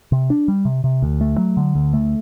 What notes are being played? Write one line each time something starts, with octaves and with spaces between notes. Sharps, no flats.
C3
D4
G3
C3
C3
D2
A3
F#3
D3
D2
A3